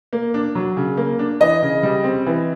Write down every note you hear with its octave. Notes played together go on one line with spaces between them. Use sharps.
A#3
D4
F#3
C#3
A#3
D4
E3 D#5
C#3
G3
C4
E3